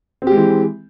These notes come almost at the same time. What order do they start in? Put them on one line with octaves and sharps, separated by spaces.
C4 G4 G#3 E3